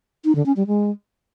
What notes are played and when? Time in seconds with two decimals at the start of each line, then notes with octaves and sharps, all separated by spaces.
0.25 D#4
0.35 D3
0.46 C#4
0.56 G3
0.67 G#3